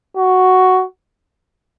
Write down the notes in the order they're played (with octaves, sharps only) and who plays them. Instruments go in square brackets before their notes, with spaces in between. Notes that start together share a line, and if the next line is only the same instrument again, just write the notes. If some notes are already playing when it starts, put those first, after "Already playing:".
[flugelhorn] F#4